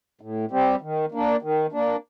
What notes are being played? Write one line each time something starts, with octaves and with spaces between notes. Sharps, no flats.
A2
G3 C4 G4
D#3
A#3 D4
D#3
A#3 D4